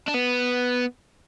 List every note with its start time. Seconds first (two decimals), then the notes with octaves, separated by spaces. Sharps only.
0.08 D4
0.14 B3